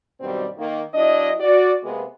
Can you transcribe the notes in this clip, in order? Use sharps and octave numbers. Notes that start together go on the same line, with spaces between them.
G2 B2 D#3 F#3 G3 C4
D#3 A#3
F#3 D4 E4 D#5
F#4 D5
C3 G#3 A#3 B3